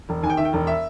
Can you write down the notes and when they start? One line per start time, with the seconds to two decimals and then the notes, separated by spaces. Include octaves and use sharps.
0.09 E1
0.23 D#2 G#5
0.30 G5
0.37 D#3 E5
0.45 G5
0.53 E1
0.67 E5